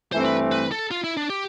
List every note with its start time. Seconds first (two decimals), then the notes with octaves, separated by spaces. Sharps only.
0.12 G2 E3 A3 C4 E4 C5
0.25 B4
0.52 B4
0.72 A4
0.91 F4
1.04 E4
1.17 D4
1.30 G4